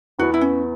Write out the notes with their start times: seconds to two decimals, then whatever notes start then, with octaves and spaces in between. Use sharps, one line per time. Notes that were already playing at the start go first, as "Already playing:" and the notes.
0.19 E2 E3 B3 F#4
0.34 E4
0.41 C#4